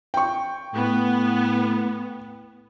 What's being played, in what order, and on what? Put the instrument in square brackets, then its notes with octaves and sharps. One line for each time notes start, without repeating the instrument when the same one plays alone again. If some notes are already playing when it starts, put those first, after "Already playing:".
[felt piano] G5 C#6
[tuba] A2 [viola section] B3